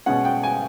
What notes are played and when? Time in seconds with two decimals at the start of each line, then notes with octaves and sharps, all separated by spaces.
0.06 B2 G#3 C#4 F#5
0.25 G5
0.43 G#5